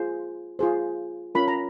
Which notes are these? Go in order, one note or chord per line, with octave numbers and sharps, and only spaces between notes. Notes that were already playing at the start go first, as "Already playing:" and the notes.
Already playing: F4 G#4 C5
F4 G#4 C5
C#4 F4 A#4 B5
A#5